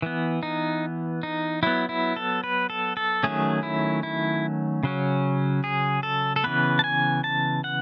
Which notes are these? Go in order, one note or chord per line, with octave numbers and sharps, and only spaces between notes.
E3 B3
D#4
D#4
F#3 B3 E4
E4
A4
B4
A4
A4
D#3 F#3 A3 C#4 G#4
E4
E4
C#3 F#3 C#4
G#4
A4
A4
C#3 E3 B3 B4
A5
G#5
A5
F#5